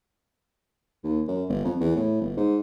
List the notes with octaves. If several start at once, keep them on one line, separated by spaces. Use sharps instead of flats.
D#2
F#2
G1
F2
E2
A2
G1
G#2